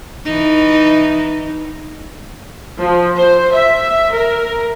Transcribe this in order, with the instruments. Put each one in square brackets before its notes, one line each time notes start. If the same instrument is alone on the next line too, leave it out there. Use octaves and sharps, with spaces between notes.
[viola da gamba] E3 D#4
[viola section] F3
C5
E5
A#4